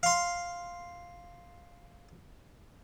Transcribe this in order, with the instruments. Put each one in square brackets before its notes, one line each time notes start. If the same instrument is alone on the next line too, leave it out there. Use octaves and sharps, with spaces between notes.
[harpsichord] F5 C6